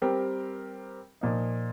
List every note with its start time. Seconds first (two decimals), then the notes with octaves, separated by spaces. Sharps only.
0.02 G3 C4 G4 A#4
1.21 A#2 F3 A#3 D#4